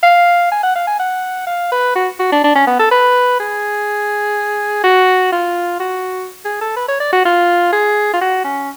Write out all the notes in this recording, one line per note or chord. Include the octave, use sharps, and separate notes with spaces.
F5
G#5
F#5
F5
G#5
F#5
F5
B4
F#4
F#4
D4
D4
C#4
B3
A4
B4
G#4
F#4
F4
F#4
G#4
A4
B4
C#5
D5
F#4
F4
G#4
F4
F#4
C#4